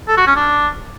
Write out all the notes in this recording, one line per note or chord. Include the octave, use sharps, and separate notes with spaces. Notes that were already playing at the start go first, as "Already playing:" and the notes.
A4
F#4
C#4
D4